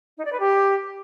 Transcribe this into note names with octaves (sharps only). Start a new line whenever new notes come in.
D#4
D5
B4
G4